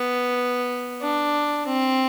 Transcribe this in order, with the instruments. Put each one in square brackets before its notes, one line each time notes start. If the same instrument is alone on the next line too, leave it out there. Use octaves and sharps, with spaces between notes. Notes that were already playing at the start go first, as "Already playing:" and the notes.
Already playing: [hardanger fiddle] B3
D4
C4